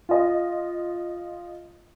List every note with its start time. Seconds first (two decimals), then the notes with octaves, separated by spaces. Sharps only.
0.09 F4 D#5